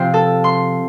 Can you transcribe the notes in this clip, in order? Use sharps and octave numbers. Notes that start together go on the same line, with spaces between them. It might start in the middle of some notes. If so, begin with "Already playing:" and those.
Already playing: C3 F3 C5
A4
C6